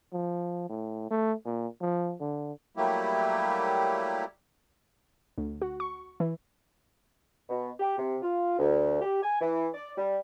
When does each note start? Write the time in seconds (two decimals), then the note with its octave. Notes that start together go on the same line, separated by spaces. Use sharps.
0.13 F3
0.69 A2
1.11 A3
1.46 A#2
1.81 F3
2.20 D3
2.77 F#3 G3 A3 A#3 E4 G4
5.38 D2
5.62 F#4
5.80 C#6
6.20 E3
7.50 B2
7.80 G4
7.98 C3
8.23 F4
8.58 D2
9.02 G4
9.23 G#5
9.41 E3
9.74 D5
9.98 G3